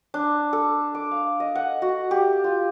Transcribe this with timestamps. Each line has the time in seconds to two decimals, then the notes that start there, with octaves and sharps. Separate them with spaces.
0.14 D4
0.53 A4
0.95 D6
1.11 F5
1.40 D#5
1.55 F#5
1.82 F#4
2.11 G4
2.44 F4